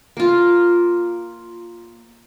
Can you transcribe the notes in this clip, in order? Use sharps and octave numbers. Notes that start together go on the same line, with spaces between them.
A#3 F4